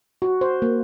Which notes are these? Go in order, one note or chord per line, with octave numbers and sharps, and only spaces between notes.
F#4
C5
A#3